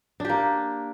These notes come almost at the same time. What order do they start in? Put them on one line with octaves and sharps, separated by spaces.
D4 G4 A#3